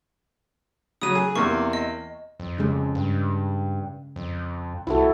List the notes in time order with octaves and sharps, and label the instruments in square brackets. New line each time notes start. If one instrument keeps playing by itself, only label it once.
[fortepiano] C#3 F#3 [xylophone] D#6 D#7
[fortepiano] G#4
[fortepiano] E2 C3 A#3 [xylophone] C#6
[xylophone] D#5
[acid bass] F2
[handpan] C#3 G#3
[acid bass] G2
F2
[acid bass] C2 [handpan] E4 F#4 A4